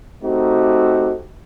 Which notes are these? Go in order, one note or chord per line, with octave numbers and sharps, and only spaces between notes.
A3 C4 D#4 F#4 G4